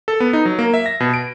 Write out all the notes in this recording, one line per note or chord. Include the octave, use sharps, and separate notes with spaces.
A4
B3
D#4
F#3
A#3
E5
A#6
B2
D7